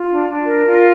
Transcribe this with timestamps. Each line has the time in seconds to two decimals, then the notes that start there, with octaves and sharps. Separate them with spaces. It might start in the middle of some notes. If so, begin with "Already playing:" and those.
Already playing: F4
0.12 D4
0.29 D4
0.47 A#4
0.66 F4